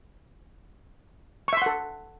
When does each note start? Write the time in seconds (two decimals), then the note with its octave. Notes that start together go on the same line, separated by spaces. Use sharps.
1.48 C#6
1.53 E5
1.57 C6
1.62 F#5
1.66 A4